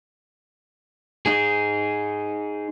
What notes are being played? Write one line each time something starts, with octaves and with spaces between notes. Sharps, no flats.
D#4 G#4